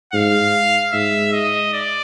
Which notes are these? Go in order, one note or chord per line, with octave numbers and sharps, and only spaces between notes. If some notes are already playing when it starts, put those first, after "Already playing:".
G#2 F5
G#2 E5
D#5
D5